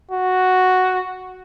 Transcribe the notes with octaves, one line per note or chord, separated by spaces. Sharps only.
F#4